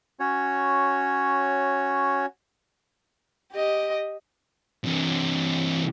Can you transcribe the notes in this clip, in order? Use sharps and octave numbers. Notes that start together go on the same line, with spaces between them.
C#4 F#4 C#5
G4 D#5
C3 E3